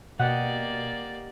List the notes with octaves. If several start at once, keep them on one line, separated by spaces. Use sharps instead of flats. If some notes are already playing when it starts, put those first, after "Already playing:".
B2 A#3 G4 D5 D#5 F#5